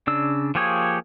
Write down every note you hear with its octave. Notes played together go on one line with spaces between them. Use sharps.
C#3 D4 E6
F3 A#3 G4 G#4 C#5